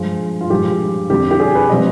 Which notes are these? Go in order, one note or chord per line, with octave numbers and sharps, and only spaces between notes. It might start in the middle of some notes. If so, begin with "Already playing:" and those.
Already playing: G2 F3 G#3
F4
G2 F3 G#3 G4
F2 D3 G3 G4
G4
G#4
B4
C3 F3 G#3 D#5